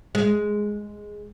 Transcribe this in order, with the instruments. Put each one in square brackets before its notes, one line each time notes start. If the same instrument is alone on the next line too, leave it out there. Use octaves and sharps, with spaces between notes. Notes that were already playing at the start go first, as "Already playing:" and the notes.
[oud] G#3